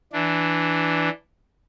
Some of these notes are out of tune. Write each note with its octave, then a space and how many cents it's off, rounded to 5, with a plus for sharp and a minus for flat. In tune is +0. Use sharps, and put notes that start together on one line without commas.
E3 +0 D4 +0